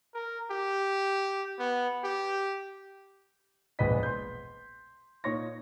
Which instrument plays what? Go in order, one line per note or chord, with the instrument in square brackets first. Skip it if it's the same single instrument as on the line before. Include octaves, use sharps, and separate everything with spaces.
[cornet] A#4
G4
B3
G4
[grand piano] E1 A#1 G#3 B4 D#5 B6
C6 G6
A#2 D#4 C#5 C#6 A#6